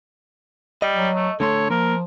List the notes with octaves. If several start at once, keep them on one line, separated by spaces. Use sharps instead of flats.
G3 D#5
F#3
A3
D3 A3 A4 C#5 C6
F3 A#3 A#4